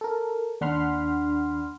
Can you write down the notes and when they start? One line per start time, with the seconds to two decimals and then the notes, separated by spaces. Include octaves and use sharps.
0.01 A4 A#4
0.61 D#2 D4 F#5 B5 C6 F6